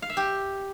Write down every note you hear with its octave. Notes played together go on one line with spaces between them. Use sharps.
F5
E5
G4